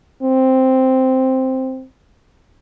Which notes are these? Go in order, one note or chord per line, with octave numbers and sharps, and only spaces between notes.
C4